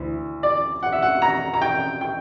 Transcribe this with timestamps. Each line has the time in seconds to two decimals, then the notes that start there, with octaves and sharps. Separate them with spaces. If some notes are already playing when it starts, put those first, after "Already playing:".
Already playing: D2 E3
0.43 D5
0.83 F#5
0.92 E5
1.02 F#5
1.22 A#5
1.54 A#5
1.62 G5
2.01 G5